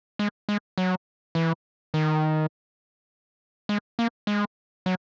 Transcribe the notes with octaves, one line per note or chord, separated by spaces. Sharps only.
G#3
G#3
F#3
E3
D#3
G#3
A#3
G#3
F#3